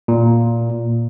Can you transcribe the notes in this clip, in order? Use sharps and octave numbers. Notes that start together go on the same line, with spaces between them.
A#2